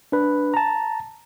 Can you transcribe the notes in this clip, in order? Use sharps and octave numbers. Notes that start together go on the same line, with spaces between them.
D4 B4
A5 A#5